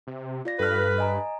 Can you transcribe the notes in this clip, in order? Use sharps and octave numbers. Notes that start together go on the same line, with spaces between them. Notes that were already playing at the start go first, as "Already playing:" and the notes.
C3
F4 D5 A#6
G2 A4 B4 F6
D#5 G#5 A#5